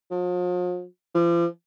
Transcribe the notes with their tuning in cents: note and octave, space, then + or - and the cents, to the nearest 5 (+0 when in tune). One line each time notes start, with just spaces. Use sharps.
F3 +45
F3 -40